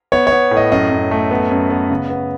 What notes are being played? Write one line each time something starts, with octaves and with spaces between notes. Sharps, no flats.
B3 C#5
B3 C#5
A2
D#5
F#2 D#5
F#2
A3
B3
F#2
B3
C#3
B3